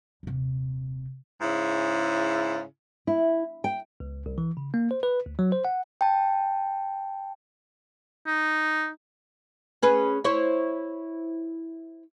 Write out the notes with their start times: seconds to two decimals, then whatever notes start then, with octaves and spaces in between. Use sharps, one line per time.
0.23 D#1 C3
1.42 G#2 C#3 E4
3.07 E4
3.64 G5
4.00 C#2
4.26 C2
4.38 E3
4.57 C#3
4.74 A#3
4.91 C5
5.03 B4
5.26 D2
5.39 F#3
5.52 C5
5.65 F#5
6.01 G5 A5
8.26 D#4
9.82 C#4 G#4 B4
10.24 E4 C5 C#5